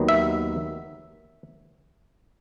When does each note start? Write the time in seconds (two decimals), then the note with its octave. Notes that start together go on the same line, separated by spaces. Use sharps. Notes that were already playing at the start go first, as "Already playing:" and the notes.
Already playing: D#2 D#3 F#3 B3
0.09 E5